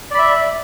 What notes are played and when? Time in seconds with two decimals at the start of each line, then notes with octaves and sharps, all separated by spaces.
0.11 D5
0.15 B5
0.18 E5